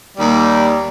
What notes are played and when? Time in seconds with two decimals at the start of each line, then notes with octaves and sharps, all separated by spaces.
0.17 D#2 G3